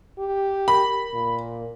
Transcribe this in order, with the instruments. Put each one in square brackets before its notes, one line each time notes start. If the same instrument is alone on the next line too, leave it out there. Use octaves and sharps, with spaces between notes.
[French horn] G4
[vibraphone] A#4 [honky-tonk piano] B5
[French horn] A#2